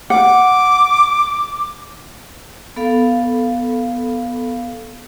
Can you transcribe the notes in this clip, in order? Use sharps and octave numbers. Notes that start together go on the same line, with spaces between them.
F#5 D6
B3 A4 F5 B5